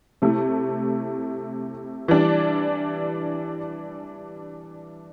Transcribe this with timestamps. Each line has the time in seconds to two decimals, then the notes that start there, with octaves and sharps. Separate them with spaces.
0.22 C3 A3 E4
2.08 E3 G3 D4